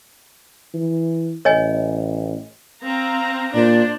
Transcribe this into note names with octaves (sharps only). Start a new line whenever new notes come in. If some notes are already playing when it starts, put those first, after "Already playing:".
E3
A1 C#5 D#5 G#5
C4 F5 A#5
A#2 D4 C5 D5